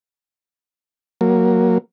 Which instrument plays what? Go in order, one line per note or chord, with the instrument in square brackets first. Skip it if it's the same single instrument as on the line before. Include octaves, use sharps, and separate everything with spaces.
[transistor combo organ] F#3 A#3